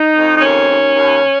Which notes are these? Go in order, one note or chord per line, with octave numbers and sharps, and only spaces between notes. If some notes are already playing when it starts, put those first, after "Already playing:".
Already playing: D#4
F2
D#4
D#2 C#4
D#2
D#2